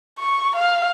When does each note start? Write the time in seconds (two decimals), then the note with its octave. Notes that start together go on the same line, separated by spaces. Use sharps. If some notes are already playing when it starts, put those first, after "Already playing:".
0.19 C#6
0.56 F5